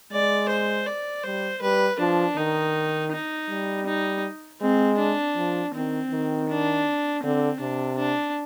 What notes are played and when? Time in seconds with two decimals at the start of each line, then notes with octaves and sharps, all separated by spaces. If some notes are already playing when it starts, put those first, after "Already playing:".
0.12 G#3 D5
0.49 C5
0.87 D5
1.24 G3 C5
1.62 G3 B4
1.99 F3 D4
2.37 D#3 D#4
3.11 D#4
3.49 G3
3.87 D#4
4.61 G#3 C4
4.98 D4
5.36 F3
5.74 D#3 C4
6.11 D#3
6.49 D4
7.23 D3 C4
7.60 C3 D4
7.98 D4